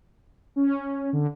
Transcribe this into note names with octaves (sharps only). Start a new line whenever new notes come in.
C#4
D3